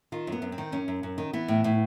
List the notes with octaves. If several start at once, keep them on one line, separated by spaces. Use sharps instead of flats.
D#3 F4
F#2 B3
F#2
C4
D#3
F#2 C#4
F#2
F#2
D#3
E3 B3
A2
A2